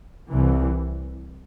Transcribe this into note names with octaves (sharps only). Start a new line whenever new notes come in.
C2 C3 E3